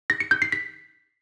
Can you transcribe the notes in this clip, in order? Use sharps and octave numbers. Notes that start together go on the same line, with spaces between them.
A#6
C#7
G6
C7
B6